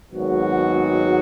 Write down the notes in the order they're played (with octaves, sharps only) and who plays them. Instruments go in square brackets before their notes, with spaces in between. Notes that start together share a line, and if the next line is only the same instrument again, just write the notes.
[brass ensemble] G#1 G#2 F#3 B3 F#4